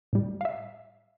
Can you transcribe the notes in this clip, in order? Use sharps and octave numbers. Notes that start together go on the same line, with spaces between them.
A2 G3
F5
E5